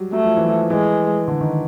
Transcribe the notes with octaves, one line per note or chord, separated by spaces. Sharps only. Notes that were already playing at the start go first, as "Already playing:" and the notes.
Already playing: F#3 G3
F#3 A3
F3
E3
F3
E3 G#3
D3
D#3